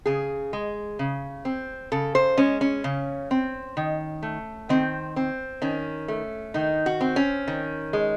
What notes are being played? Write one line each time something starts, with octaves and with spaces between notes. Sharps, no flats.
C#3 G#4
G#3
C#3
C4
C#3 A4
C5
G#3 C#4
C#4
C#3
C4
D#3
A3
D#3 C4
C4
D#3 C#4
A3
D#3 D#4
F#4
C4
C#4
D#3
G#3